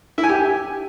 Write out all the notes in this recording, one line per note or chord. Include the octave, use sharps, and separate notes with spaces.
E4
G#5
G4